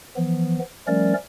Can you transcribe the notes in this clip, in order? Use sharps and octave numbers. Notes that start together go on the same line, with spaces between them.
E3 F3 B3
F3 G3 A3 C#4 A#4 D5